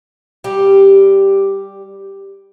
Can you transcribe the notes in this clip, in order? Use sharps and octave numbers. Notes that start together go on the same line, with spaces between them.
G3 G4